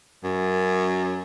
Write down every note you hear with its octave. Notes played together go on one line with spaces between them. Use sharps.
F#2